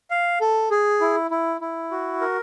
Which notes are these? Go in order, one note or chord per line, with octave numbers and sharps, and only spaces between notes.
F5
A4
G#4
E4
E4
E4
F#4
A#4